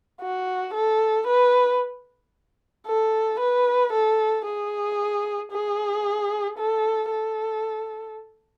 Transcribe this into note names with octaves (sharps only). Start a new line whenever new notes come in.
F#4
A4
B4
A4
B4
A4
G#4
G#4
A4
A4